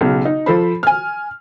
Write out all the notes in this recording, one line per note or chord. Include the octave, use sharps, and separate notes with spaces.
B1 C#3
D#4
F3 A4 C5 B5
G#5 F6